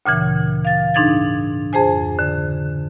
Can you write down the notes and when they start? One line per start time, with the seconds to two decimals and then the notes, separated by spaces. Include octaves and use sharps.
0.05 D2 A#2 C#3 E3
0.65 F5 A6
0.94 G#2 D4 D#4 G#6 A6
1.73 F2 G#4 C5 G#5
2.19 D3